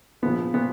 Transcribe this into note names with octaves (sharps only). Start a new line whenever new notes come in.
A#1 A#2 F3 B3
A#2 F3 B3